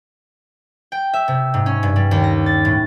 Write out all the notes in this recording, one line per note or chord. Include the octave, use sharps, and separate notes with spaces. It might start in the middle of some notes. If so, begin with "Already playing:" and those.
G5
E5
C3
G#2
C#4
G2
G3
D#2
A#6
A6
A2